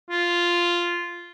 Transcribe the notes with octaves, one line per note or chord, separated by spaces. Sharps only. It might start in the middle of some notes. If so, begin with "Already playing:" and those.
F4